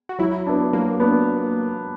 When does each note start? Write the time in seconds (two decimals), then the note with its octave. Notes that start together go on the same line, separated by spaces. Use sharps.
0.09 F#4
0.19 F#3 E4
0.47 B3 D4
0.73 F#3 A#3
1.00 B3 D4